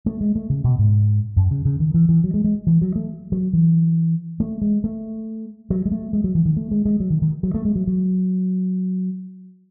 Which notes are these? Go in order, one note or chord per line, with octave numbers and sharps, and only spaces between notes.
A3
G#3
A3
C#3
B2
G#2
F#2
C#3
C#3
D#3
E3
E3
F#3
G#3
G#3
E3
F#3
A3
F#3
E3
A3
G#3
A3
F#3
G#3
A3
G#3
F#3
E3
D#3
A3
G#3
G#3
F#3
D#3
D#3
F#3
A3
G#3
F#3
F#3